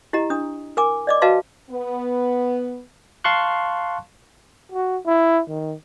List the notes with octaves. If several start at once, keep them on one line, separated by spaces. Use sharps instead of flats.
E4 G4 D#5 A#5
D4 D#6
A#4 G#5 D6
D5 D#5 D6
F#4 B4 D#5 F5 A5 C6
B3
F5 A5 C6 C#6 F#6
F#4
E4
D#3